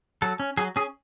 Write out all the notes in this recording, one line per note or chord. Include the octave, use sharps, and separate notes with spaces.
F#3 A4
C#4
F#3 G#4
C#4 G#4